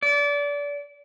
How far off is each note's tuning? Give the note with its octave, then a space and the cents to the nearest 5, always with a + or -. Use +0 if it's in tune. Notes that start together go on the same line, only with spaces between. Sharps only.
D5 -30